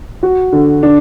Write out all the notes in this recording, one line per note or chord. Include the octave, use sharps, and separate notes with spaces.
F#4
D3
D4